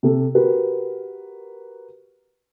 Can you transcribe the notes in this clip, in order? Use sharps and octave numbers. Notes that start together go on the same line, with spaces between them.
C3 A4
F#4 G4 A#4 B4